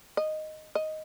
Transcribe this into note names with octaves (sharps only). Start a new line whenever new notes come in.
D#5
D#5